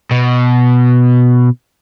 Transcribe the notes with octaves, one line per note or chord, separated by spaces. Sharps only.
B2